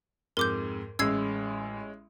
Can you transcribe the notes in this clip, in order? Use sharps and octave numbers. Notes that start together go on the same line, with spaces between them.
F2 G#2 A#4 D6 G6
A1 G#3 C#4 E6 G#6 C7